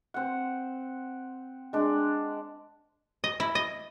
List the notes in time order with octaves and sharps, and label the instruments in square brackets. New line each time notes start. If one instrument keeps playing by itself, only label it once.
[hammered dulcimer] C4 F#5
G#3 D4
[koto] D#5
E4
D#5